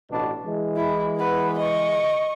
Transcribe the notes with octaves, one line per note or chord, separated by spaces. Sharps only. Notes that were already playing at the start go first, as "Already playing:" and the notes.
A1 B2 D4
E3 G#3
E4
B3 B4
D#5 C#6